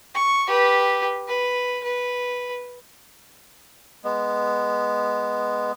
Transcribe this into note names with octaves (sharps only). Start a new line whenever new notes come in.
C#6
G4 B4
B4
B4
G#3 B3